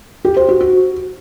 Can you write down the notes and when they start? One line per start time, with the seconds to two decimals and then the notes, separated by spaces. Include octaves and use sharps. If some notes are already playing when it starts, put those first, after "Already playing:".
0.25 G4
0.37 C5
0.49 F#4
0.61 F#4